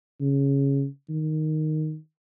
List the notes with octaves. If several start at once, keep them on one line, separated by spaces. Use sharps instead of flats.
C#3
D#3